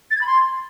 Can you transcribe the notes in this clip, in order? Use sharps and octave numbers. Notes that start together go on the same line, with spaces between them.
A6
G#6
B5
C6